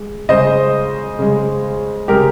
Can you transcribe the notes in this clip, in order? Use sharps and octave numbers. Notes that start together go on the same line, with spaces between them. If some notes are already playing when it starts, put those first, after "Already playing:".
Already playing: G#3
C#3 G#3 C5 D#5
C#3 G#3
C#3 G#3 G4 A#4